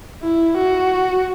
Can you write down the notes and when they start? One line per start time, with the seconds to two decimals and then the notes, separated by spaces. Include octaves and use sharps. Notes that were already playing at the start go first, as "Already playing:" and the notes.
0.23 E4
0.57 F#4